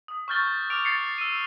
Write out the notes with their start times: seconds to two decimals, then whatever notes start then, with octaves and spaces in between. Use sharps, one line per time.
0.08 D#6
0.28 C#6 E6 F6 G6 A6 G7
0.70 D6 F6 D7 F7
0.85 A6 C7 C#7
1.18 E6 D#7